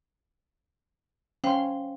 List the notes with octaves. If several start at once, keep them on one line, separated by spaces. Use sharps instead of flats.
C#4 C5 F5 G5 C6